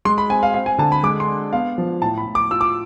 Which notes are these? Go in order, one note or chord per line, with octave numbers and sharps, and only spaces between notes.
G#3 C6
B5
C4 G#5
F5
C4 F5
G#5
D3 A5
B5
G#3 D6
C6
D4
B3 F5
F3
A2 A5
B5
A2
D6
F4 E6
D6